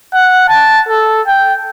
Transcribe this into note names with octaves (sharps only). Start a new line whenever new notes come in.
F#5
A5
A4
G5